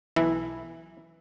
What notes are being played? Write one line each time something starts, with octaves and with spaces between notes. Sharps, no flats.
B1 E3 E4